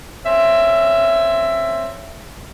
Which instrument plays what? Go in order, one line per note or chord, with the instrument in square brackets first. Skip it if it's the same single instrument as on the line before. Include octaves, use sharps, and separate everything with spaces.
[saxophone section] C4 C#4 E5